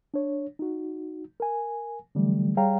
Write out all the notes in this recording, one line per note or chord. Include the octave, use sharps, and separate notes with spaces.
D4 C#5
D#4 F#4
A#4 G#5
D3 E3 F#3 G3 A3
G3 G#4 C#5 F5 G5 A#5